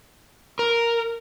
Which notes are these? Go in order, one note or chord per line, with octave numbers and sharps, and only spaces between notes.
A#4